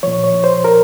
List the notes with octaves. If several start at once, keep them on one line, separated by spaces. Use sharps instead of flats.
A#2 F3 C#5
C#5
C5
A#4